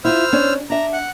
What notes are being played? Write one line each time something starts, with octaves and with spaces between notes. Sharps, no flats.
E4 F4 C5 E6 F6
C#4 D4
D4 E5 A#5
F#5